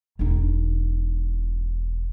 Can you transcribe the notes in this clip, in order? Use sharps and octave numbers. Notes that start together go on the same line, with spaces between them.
E1 D#4